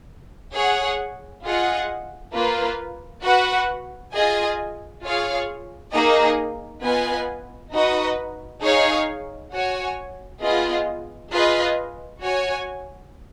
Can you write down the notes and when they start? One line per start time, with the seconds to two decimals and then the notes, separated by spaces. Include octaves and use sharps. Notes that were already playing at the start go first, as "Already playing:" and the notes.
0.54 G#4 C#5 F#5
1.44 F4 G#4 D#5 F#5
2.34 A#3 F4 B4
3.24 F#4 B4 F#5
4.13 F4 G#4 D#5 G#5
5.03 F4 G#4 C#5 F5
5.93 A#3 D#4 G#4 D#5
6.82 B3 F4 B4 D#5 G#5
7.72 D#4 F#4 B4 D#5
8.62 D#4 G#4 C#5 F5
9.52 F#4 C#5 G#5
10.41 B3 F4 G#4 D#5
11.31 F4 G#4 B4 D#5
12.21 F#4 C#5 G#5